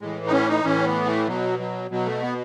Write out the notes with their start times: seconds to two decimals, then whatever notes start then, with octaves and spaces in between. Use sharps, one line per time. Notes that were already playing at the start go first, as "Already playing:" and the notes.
0.01 A2 E3 G#3
0.27 D#4
0.32 C#4
0.49 D#4
0.63 A2 E3 C#4
0.85 B3
1.06 A3
1.27 B2 F#3
1.59 F#3
1.90 B2 F#3
2.06 A3
2.22 B3